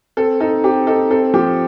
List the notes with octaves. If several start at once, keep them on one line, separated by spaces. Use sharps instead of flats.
C4 A4
D#4 A4
C4 G4
D#4 A4
C4 A4
F3 G4